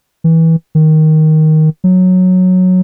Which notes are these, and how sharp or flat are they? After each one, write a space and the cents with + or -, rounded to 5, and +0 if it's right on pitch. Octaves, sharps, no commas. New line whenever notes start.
E3 -20
D#3 +5
F#3 -10